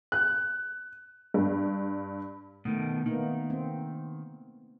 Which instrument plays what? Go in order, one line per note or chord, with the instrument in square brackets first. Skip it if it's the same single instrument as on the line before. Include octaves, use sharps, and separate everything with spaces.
[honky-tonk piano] F#6
G2
[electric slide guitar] B2 D#3 [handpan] A3
[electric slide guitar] D#3 [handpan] A#3 B3 D#4
[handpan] C4